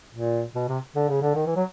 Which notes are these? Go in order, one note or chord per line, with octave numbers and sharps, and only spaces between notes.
A#2
B2
C3
D3
C#3
D3
D#3
E3
F#3